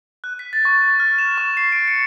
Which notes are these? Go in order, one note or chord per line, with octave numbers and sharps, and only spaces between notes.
F#6
B6
A6
C#6
A6
F6
E7
C#6
C7
D7
C#7